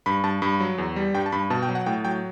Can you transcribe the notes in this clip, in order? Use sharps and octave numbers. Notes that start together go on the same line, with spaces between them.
G2 B5
G2 A5
G2 B5
F#3
E2
G3
G2 G5
A5
G2 B5
B2 A5
G5
F#3
F#5
A2 G5
F#3 G5